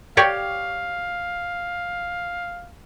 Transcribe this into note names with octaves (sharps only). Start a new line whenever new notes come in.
G4 C#5 D5 F5